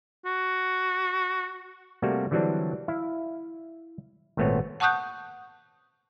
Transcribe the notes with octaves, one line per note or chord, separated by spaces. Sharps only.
F#4
C3 G3 A3 A#3 F#4
D3 E3 F#3 G3 C4 D4
E4 E5 F5
G#1 A#2 A3 B3 C4 C#5
F#5 A5 C#6 D#6 F#6 G6